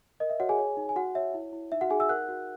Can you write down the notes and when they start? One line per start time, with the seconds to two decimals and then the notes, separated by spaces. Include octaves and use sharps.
0.20 A#4 D#5
0.30 E5
0.39 F#4 C#5 F#5
0.49 G#4 G#5
0.58 C#5
0.77 D#4
0.89 G#5
0.96 F#4 F#5
1.15 C#5 E5
1.34 E4
1.53 E4
1.72 D#4 E5
1.81 F#4 F#5
1.90 D#4 G#4 G#5
2.00 E5 E6
2.09 A#4 F#5 F#6
2.29 F#4